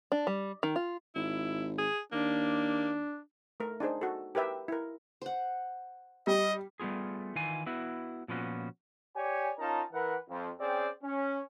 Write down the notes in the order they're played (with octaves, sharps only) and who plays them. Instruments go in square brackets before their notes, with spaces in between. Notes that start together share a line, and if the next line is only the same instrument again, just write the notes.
[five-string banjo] D4
G3
D#3
F4
[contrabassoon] G#1 [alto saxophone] E4
[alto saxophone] G#4
[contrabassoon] D#2 [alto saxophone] A#3 [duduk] D4
[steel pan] A3 A#4
D4 D#4 G#4 C5
F#4 A4
G4 A#4 B4 E5 G5
E4 A#4
[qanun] C5 F#5
[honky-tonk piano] G3 [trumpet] D#5
[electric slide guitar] G3 A3 B3 F4 G#4
D#3 E3 F4 G#5
B3 E4 F#4
A#2 F3 B3 C#4 F#4
[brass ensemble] G4 C#5 D5 G#5
C#4 D#4 F4 A#4 A5 A#5
E3 A#4 B4 F#5
F2
C4 C#4 G#4 D5 G5
C#4